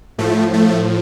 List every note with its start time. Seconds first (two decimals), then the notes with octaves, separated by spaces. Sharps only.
0.18 A2 F3 A3
0.54 A3